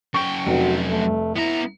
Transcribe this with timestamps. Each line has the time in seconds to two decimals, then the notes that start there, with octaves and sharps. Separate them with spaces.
0.14 F#2 G5 C#6
0.46 F1 F#4
0.89 A3
1.36 B3 E4 A#5